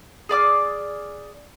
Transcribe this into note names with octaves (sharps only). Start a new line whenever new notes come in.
G#4 D5 D6 F6